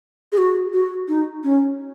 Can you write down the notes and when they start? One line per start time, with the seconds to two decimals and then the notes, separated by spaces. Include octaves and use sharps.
0.32 G#4
0.38 F#4
0.73 F#4
1.08 D#4
1.44 C#4